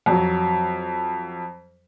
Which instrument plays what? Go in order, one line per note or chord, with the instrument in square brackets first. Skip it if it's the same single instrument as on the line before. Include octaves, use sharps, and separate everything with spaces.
[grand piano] F2 F#3